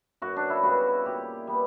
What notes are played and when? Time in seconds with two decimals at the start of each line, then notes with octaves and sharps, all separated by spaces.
0.22 F#2 F#4
0.36 D4
0.50 E4
0.63 C#3 G3 B3 F#4
1.06 A#2 G4
1.47 G3 B3